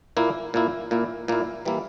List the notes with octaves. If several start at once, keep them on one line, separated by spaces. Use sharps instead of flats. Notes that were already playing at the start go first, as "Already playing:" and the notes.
A#2 A#3 E4
A#2 A#3 E4
A#2 A#3 E4
A#2 A#3 E4
E3 G3 A#3 E4